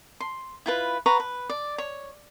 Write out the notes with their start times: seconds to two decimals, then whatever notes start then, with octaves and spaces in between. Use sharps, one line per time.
0.20 C6
0.66 E4 F4 B4
1.06 B4 F#5 A#5 C#6
1.20 B4
1.50 D5
1.78 C#5